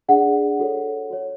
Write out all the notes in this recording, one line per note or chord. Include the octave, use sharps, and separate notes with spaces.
D4 G#4 D5 F#5
F#4 A4 C#5
F#4 C#5